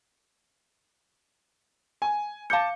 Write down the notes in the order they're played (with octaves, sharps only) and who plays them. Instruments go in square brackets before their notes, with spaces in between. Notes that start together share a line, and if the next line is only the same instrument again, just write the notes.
[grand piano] G#5
[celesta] F5 C#7 [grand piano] A5 D6 G6